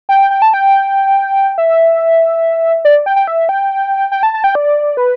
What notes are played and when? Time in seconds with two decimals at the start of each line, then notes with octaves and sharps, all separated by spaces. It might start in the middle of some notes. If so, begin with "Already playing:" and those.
0.09 G5
0.30 G5
0.42 A5
0.54 G5
1.58 E5
2.85 D5
3.06 G5
3.16 G5
3.27 E5
3.49 G5
4.12 G5
4.23 A5
4.34 A5
4.44 G5
4.55 D5
4.97 B4